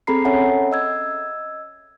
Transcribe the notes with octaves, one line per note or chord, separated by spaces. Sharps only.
C4 G#4 A4 A#5 B5 C7
C#4 A4 C#5 E5 F#5 G#5
D#5 E6 G#6